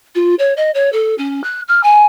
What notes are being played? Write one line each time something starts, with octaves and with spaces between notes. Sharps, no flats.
F4
C#5
D#5
C#5
A4
C#4
F#6
F6
G#5